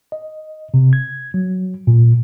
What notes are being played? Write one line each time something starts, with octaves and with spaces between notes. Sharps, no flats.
D#5
C3
G#6
F#3
A#2